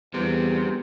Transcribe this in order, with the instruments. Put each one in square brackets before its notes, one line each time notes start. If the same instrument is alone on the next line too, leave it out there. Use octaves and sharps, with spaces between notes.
[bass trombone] E2 [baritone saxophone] C3 [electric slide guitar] G3 B3